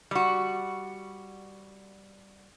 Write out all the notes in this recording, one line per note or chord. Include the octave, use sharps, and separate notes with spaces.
G3 F#4